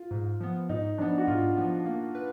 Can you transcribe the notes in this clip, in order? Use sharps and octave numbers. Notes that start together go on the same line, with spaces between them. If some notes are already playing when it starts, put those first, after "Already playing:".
Already playing: F4
G#2
F3 B3
G#2 D#4
F3 B3 D4
F#4
G#2 F4
F3 B3
A#3
B4